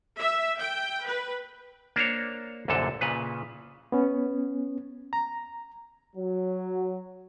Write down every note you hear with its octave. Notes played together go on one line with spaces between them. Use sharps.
E5
G5
B4
A#3 D4 C5 C#5
C2 F#2 A#2 D3 A4
A#2 C#3 B4
B3 C#4
A#5
F#3